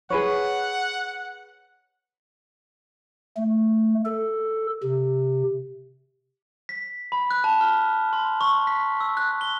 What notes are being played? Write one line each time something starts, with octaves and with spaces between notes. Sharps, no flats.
G#4 B4 C#5 F#5
A3
A4
C3
B6
B5
F#6
A5
F6
C6
C#6
B6
E6
F#6
G7